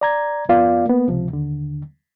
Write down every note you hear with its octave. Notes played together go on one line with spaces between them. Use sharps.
D5 A#5 G#6
F2 B3 F4 D5 F5
A#3 B3
C#2 C3 F3
D#2 D3